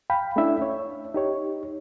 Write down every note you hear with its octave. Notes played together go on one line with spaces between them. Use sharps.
F5 G5 B5
A3 C#4 D4 E4 E5
C#5
D#4 G4 C#5